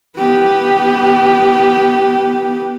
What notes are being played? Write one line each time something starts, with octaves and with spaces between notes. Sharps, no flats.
B3 G4